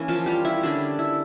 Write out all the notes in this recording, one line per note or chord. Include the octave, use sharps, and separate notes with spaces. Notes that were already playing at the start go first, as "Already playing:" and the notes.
Already playing: E3 A#3 C#4
F3 F4
G3 G4
E4
D3 G3 C#4 D4
E4